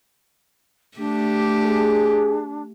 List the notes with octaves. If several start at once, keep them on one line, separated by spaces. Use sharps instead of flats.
A3 D4 G4
G#4